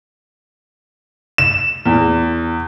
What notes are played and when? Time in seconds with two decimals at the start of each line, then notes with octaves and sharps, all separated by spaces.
1.38 E7
1.86 E2